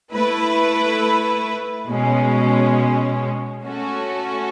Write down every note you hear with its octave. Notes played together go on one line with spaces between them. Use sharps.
A3 E4 B4
B2 G#3 C#4
A3 C#4 F#4 A4